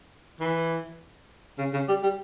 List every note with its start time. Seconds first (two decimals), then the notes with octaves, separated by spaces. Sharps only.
0.40 E3
1.58 C#3
1.73 C#3
1.88 G3
2.03 G3